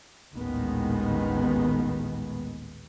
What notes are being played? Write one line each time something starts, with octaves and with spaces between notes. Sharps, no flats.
A1 D#2 A#2 D#3 G#3 B3